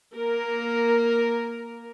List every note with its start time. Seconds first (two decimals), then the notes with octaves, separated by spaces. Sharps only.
0.13 A#3 A#4